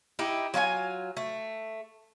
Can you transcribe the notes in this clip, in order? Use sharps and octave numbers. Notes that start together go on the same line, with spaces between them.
D#4 E4 G4
F#3 F4 F#4 G#5
A3